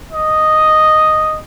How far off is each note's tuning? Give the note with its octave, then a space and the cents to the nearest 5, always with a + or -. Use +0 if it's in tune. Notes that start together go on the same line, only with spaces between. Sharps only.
D#5 -5